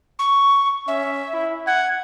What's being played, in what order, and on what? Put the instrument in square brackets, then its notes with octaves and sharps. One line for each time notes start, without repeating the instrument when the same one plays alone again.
[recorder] C#6
[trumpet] C#4 [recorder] E5
[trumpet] E4
[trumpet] F#5 [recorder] G#6